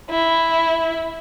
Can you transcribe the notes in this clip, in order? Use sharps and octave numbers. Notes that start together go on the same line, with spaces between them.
E4